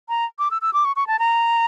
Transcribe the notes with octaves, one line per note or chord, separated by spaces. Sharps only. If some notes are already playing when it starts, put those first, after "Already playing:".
A#5
D6
E6
E6
D6
C#6
C#6
A5
A#5